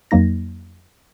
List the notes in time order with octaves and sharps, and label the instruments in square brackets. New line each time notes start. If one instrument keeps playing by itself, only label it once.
[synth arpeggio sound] F2 F#3 A#3 D#4 A#6